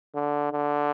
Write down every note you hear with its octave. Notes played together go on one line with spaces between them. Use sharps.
D3
D3